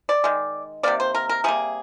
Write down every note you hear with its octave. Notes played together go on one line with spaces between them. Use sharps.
D5
D#3 G#3
C3 D#3 A#3 D5
C5
A#4
A#4
C3 G3 A#3 G#4